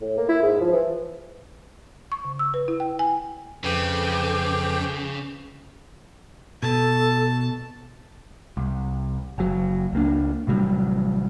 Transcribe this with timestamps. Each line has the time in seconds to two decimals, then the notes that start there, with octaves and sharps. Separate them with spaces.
0.01 A2
0.17 A#3
0.29 E4
0.42 G#2
0.61 F3
0.72 E3
2.12 C#6
2.24 C#3
2.39 E6
2.54 B4
2.68 E4
2.80 G5
2.99 G#5
3.64 F2 C#3 A4 B4 G5 D6
6.63 B2 A4 A5
8.57 C2
9.38 F#1 F#3
9.93 C#2 A#3 D4
10.47 A1 C3 F#3 G3